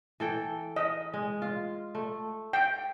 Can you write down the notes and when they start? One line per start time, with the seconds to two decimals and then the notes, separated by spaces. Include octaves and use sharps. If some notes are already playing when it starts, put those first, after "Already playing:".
0.20 E3 A4 G5
0.76 D#5
1.14 G#3
1.42 F4
1.95 A3
2.53 G5